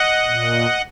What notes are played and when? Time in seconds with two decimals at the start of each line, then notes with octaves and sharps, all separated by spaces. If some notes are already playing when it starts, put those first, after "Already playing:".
Already playing: D#5 F#5
0.24 A#2